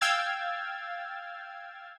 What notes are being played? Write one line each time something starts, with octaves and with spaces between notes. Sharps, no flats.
F5 G5 E6 F6 G#6 A6